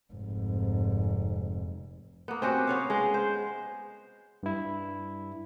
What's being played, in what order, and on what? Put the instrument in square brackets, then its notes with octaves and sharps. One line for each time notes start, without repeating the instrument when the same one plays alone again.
[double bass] F1 G#2
[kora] A#3 B3
C4 C#4 F#4 G4
B3 C#5 F5
G#3
C5
[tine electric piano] G2 E4